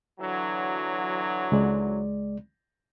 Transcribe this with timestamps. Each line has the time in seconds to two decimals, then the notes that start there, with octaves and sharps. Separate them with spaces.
0.20 D3 E3 F#3
1.52 C#2 G#3 D5